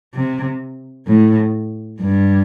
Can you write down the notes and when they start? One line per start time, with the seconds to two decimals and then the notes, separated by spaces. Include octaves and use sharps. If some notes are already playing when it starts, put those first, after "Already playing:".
0.14 C3
1.07 A2
2.01 G2